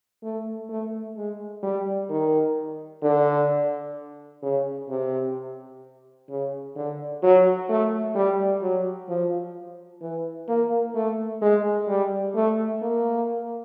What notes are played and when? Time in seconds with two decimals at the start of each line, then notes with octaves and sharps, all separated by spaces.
0.24 A3
0.70 A3
1.16 G#3
1.63 G3
2.10 D#3
3.03 D3
4.43 C#3
4.89 C3
6.30 C#3
6.76 D3
7.23 F#3
7.69 A3
8.15 G3
8.62 F#3
9.09 F3
10.02 E3
10.49 A#3
10.95 A3
11.42 G#3
11.88 G3
12.35 A3
12.82 A#3